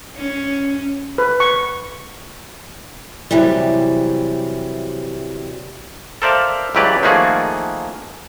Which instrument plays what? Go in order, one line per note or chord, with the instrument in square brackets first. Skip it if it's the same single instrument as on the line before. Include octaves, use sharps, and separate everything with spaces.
[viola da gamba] C#4
[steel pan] B4
C#6
[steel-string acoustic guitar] C3 E3 F#3 G3
[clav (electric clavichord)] A4 A#4 C5 D5 E5 F5
C#2 E3 F#3 G4 B4 D5
D#3 F3 A3 A#3 F#4 G#4